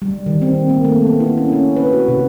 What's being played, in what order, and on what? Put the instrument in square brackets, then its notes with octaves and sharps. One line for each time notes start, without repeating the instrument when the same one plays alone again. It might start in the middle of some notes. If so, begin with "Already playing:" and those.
[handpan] G3
D#3
C4
A#3
A3
B3
E4
C#4
C#4
B4
F#4
C3